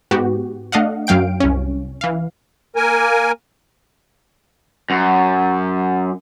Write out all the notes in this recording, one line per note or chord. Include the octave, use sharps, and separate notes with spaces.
G#2 B3 F#4 G4
A3 D4 D#5 F5 F#5
F#2 F#3 F5 G5 D7
C2 C#4
E3 F5
A#3 A#4 G#5
F#2